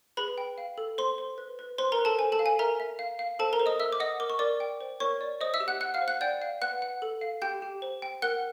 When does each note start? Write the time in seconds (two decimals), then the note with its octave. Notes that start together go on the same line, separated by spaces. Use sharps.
0.17 G#4 B4 B5
0.38 G5
0.58 F5
0.78 A4
0.98 C5 C6
1.18 C5
1.38 B4
1.59 B4
1.78 B4 C5 C6
1.92 A#4 A#5
1.99 B4
2.05 A4 A5
2.18 C5 G#5
2.32 A4 A5
2.39 F5
2.46 G#5
2.59 A#4 E5 A#5
2.80 E5
2.99 F5
3.19 F5
3.39 A4 C5 A5
3.53 A#4 A#5
3.60 C5
3.66 D#5 D#6
3.80 A#4 E5 E6
3.93 D6
4.00 D#5 F#5 D#6
4.20 A#4 D6
4.30 C#6
4.39 A#4 D5 D6
4.60 G5
4.81 C5
5.00 A#4 C#5 C#6
5.21 D5
5.41 C5 D#5 D#6
5.54 E5 E6
5.60 G4
5.68 F#5 F#6
5.81 F#5 F#6
5.94 F5 F6
6.02 C5
6.08 F#5 F#6
6.21 D5 G5 G6
6.42 F5
6.62 B4 F#5 F#6
6.82 F#5
7.02 A4
7.21 F5
7.42 G4 G5 G6
7.62 G4
7.82 C5
8.02 G5
8.22 A#4 F#5 F#6